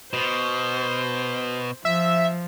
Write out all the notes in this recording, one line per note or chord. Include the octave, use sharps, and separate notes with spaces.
B2 C5
F3 E5